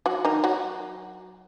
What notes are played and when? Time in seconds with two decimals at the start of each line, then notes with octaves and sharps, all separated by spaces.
0.06 F#3 F#4
0.25 D#3 D#4
0.44 F#3 F#4